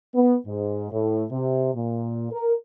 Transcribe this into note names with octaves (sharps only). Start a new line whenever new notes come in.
B3
G#2
A2
C3
A#2
A#4